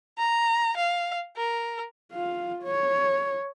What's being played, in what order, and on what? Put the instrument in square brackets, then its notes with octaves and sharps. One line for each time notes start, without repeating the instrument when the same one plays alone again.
[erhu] A#5
F5
A#4
[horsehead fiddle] F4 F5
C#5